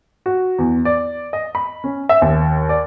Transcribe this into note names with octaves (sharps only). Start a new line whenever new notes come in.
F#4
E2
D5
D#5
B5
C#4
E5
D#2
D5